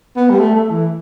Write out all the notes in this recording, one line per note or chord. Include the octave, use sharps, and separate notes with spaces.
B3
G3
A3
A3
E3